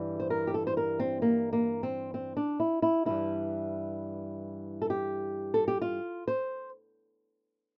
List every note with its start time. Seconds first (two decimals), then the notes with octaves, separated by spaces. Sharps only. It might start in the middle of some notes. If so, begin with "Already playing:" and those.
Already playing: G2 E3 G3
0.20 C5
0.30 A#4
0.47 G4
0.54 A4
0.67 C5
0.77 A#4
0.99 C4
1.22 A#3
1.53 A#3
1.83 C4
2.14 C4
2.37 D4
2.60 E4
2.82 E4
3.05 G2 E3 G3 E4
4.82 A4
4.90 G4
5.54 A4
5.68 G4
5.82 F4
6.28 C5